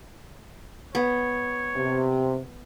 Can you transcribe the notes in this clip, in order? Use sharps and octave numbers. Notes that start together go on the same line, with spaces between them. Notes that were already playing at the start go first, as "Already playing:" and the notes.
B3 C#5
C3